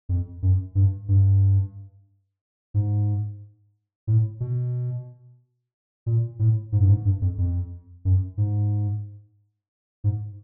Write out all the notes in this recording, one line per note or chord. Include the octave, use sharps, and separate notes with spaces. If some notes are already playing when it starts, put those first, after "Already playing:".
F2
F#2
G2
G2
G#2
A2
B2
A#2
A2
G#2
G2
G#2
G2
F2
F2
F#2
G#2
G#2